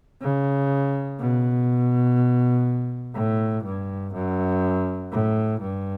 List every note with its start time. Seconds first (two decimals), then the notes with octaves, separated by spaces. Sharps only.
0.22 C#3
1.20 B2
3.15 A2
3.64 G2
4.14 F#2
5.12 A2
5.61 G2